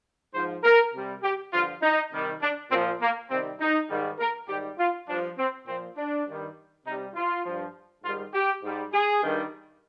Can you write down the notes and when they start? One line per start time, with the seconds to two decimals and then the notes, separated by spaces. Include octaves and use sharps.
0.34 G#2 F3 C5
0.64 A#4
0.93 C3 G3
1.23 G4
1.53 G2 D3 F3 F4
1.82 D#4
2.12 C3 D#3 G3
2.42 D4
2.71 A#2 F3 C4
3.01 A#3
3.30 C3 D#3 G3 C4
3.60 D#4
3.89 G#2 D#3 G3
4.19 A#4
4.48 G#2 D#3 G3 G4
4.79 F4
5.08 G2 F3 D4
5.38 C4
5.67 A#2 F3 C4
5.97 D4
6.27 G2 D#3 G3
6.86 C3 G3 D#4
7.15 F4
7.45 G2 F3
8.04 G#2 D#3 G3 F4
8.34 G4
8.63 G#2 G3
8.93 G#4
9.23 G2 D#3 G3